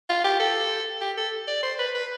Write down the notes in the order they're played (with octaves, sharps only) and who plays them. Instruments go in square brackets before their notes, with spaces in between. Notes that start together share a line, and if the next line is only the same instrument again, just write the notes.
[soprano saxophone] F4
G4
A4
G4
A4
D5
C5
B4
B4